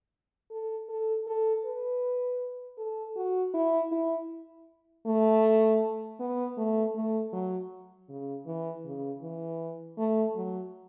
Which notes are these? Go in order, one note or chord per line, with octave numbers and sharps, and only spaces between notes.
A4
A4
A4
B4
A4
F#4
E4
E4
A3
B3
A3
A3
F#3
C#3
E3
C#3
E3
A3
F#3